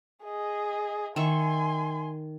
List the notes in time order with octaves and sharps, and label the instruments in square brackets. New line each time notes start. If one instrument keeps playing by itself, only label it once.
[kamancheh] G#4 D#5
[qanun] D#3 E5 C#6 [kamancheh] G#5 C6